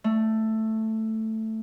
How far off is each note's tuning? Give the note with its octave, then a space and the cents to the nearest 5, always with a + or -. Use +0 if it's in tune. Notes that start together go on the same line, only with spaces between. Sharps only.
A3 +5